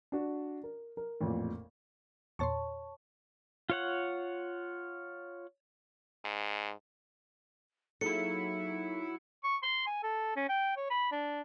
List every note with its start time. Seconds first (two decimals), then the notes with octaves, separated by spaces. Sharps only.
0.12 D4 F#4
0.64 A#4
0.97 A#4
1.21 A1 F2 A#2
2.39 E2 A#2 C#5 A5 C6 C#6
3.70 F4 C#5 F#5
6.25 G#2
8.01 F#3 A#3 D#4 E4 G#4 A4 C#7
9.44 C#6
9.63 C6
9.87 G#5
10.03 A4
10.36 C#4
10.49 G5
10.77 C#5
10.90 B5
11.11 D4